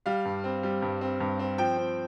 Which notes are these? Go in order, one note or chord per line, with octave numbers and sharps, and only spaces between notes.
G3 F5
G2
C4
G3
G2
C4
G2
C4
F3 G5
C4